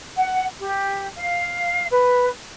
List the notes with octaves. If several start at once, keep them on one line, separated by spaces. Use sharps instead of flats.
F#5
G4
F5
B4